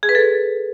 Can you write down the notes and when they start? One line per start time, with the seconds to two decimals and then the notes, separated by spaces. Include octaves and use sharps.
0.03 G#4
0.09 B4
0.15 A4